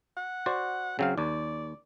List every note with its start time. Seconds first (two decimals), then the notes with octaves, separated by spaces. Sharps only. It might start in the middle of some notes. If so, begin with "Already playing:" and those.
0.17 F#5
0.46 F#4 C5 D5
0.99 C#3 F#3 C4 F5
1.18 D#2 D5